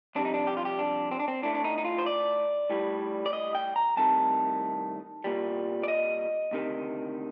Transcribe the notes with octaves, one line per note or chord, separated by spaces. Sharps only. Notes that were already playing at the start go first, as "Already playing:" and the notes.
F2 C3 G3 D4
D#4
D4
G4
F4
G4
D4
C4
D4
C4
A2 A3 D4
D4
D#4
D#4
F4
C5
D5
A2 G3
D5
D#5
G5
A#5
C2 C3 D#3 A3 A5
C2 A#2 G3
D5
D#5
D2 C3 D#3